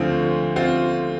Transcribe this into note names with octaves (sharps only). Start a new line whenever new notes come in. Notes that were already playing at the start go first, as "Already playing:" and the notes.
Already playing: D2 D3 F3 C4 F4
C4 F4